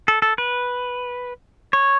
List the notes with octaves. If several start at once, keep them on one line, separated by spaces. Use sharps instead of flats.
A4
A4
B4
C#5